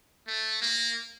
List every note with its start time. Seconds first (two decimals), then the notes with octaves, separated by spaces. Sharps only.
0.27 A3
0.62 A#3